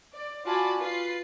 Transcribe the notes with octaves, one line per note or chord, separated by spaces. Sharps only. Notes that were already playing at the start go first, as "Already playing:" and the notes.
D5
F4 F#4 D5 G#5 A5 B5
F4 B4 C7